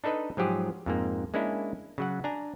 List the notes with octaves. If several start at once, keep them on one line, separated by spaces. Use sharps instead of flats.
D4 D#4 A4 B4 D#5
G#2 F3 F#3 G4 G#4
F2 G#2 A#3
G#3 A#3 C#4 D4 E4
C#3 F#3 F#5
D4 G#5 A#5